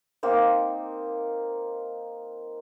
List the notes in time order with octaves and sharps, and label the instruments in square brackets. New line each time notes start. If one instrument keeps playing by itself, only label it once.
[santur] A#3 C4 D#4